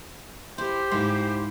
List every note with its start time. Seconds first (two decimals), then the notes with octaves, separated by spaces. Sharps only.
0.58 E4 G4 C5
0.91 G#2 E4 C5 F5